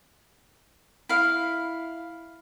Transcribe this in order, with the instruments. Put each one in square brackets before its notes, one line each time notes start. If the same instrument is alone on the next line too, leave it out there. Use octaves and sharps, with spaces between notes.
[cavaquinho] E4 F5